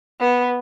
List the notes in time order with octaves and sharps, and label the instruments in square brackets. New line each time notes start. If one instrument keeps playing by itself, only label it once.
[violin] B3